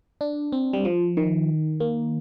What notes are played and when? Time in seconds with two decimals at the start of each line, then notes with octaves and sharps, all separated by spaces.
0.21 D4
0.52 C4
0.73 G3
0.85 F3
1.17 D#3
1.80 A#3